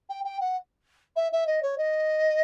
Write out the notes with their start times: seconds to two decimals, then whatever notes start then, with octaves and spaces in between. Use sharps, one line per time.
0.09 G5
0.24 G5
0.41 F#5
1.16 E5
1.32 E5
1.47 D#5
1.63 C#5
1.78 D#5